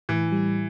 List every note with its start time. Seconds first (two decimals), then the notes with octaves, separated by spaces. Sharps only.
0.09 A2 E3
0.32 G3